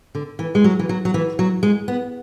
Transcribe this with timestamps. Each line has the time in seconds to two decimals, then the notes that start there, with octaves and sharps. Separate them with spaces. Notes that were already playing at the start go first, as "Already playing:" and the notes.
0.15 D3
0.39 E3
0.55 G#3
0.64 F#3
0.79 E3
0.89 F#3
1.05 F#3
1.14 E3
1.39 F#3
1.63 G#3
1.88 B3